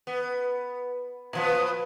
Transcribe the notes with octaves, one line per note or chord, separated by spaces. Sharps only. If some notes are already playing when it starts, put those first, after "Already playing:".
B3
A#2 F3 B3